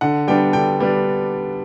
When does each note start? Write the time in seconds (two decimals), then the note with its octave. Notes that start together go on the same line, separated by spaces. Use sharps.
0.01 D3 F#5
0.28 G3 B3 D4 G5
0.53 D3 G5
0.80 G3 B3 D4